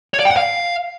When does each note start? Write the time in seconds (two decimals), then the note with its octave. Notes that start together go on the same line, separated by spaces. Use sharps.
0.14 C#5
0.19 D5
0.25 G5
0.31 F#5
0.36 F5